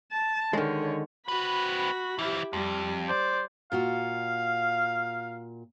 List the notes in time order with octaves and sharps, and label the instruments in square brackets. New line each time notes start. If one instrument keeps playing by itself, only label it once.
[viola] A5
[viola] D3 C#5 [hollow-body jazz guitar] D#3 G#3
[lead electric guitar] C4 B4 [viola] F#4 B5
[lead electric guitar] E3 F3 [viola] E4 G4
[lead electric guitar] F2 [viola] G3
[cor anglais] C5 [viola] D5
[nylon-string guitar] A#2 F4 F#4 [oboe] F5